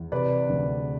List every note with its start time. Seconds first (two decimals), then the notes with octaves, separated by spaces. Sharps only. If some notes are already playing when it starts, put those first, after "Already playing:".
Already playing: E2
0.12 C3 B4 D5
0.49 D2